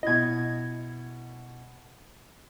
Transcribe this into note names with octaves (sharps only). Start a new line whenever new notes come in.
B2 E4 D#5 G#6